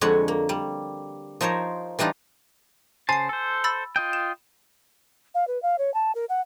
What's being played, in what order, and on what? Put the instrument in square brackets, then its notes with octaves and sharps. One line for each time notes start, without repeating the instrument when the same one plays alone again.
[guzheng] F2 D3 G#3 C#5 F#5
A#3
G3
F3 D#4 A#4 C5 C#5
E3 G3 D4 D#4 F4
[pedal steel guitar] C#3 C5 A5 [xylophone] G#5 C7
[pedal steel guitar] A4 C5
[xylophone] B5 E6 A6
[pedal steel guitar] F4 D#5 G5
[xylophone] E7
[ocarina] F5
B4
F5
C#5
A5
A#4
F#5